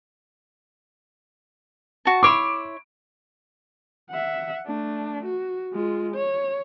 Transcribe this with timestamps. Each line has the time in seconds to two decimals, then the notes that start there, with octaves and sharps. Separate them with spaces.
2.05 F#4 A5
2.23 E4 C#5 C6 D6 D7
4.10 E5 F#5
4.66 A3 D4
5.25 F#4
5.73 G#3 F4
6.15 C#5